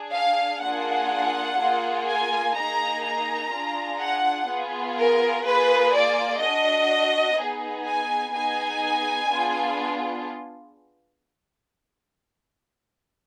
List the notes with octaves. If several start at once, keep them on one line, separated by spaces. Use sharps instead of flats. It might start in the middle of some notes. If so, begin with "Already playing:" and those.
Already playing: D4 G#4
F5
A#3 D4 F4 G#4 F#5
A#3 F4 G#4
G#5
A#3 D#4 G#4 A#5
A#5
D4 F4 G#4
F#5
B3 F4 G#4
A#4
A#3 F4 G#4 B4
D5
D4 F#4 D#5
B3 D#4 G#4
G#5
B3 D#4 G#4 G#5
B3 D4 F4 G#4